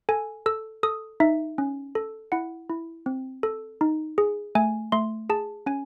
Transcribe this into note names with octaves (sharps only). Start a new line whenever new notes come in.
A4 G#5
A4 E6
A4 D#6
D#4 E5
C#4
A4
E4 F#5
E4
C4
A4
D#4
G#4
A3 G#5
A3 C6
G#4 A5
C#4 G#5